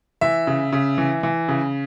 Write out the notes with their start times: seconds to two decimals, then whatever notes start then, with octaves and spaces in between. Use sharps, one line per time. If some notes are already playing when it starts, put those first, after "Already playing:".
0.21 E3 E5
0.47 C#3
0.73 C#3
0.98 E3
1.23 E3
1.48 C#3